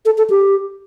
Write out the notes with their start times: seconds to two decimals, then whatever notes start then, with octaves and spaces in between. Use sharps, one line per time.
0.05 A4
0.18 A4
0.30 G4